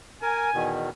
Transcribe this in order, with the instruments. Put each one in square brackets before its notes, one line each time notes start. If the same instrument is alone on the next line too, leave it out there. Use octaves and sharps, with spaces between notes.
[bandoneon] A#4 [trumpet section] G#5
[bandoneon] E2 B2 D#3